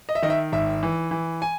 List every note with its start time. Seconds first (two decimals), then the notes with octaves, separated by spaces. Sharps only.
0.09 D#5
0.15 E5
0.22 D#3 D#5
0.30 E5
0.52 G#1 E5
0.83 E3
1.11 E3
1.42 G#5